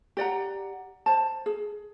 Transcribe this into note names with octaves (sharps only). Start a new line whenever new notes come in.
G4 D5 F#5 A#5
C5 A5
G#4